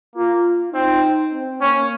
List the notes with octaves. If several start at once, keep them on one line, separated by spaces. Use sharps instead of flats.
A#3 F4
C4 D#4
C4
A#3 C#4